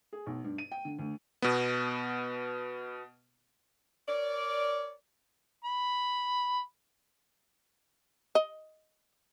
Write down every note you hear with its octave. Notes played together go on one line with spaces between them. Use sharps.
G#4
B1
G2
D#7
G5
D3
D2
B2 B3
A#4 C#5 D5
B5
D#5